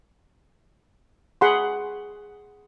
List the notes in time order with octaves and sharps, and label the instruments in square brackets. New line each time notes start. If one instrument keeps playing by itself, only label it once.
[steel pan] G#4 F#5 B5 C6